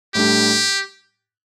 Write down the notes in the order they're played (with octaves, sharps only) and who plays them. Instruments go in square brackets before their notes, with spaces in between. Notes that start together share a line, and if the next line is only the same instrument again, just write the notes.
[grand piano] A2 G3 D4 [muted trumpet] G4